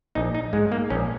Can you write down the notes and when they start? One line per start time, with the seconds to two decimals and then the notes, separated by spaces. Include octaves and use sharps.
0.15 A#1 D#4
0.35 D#4
0.53 G#2 G#3
0.72 A#3
0.90 A#1 C#4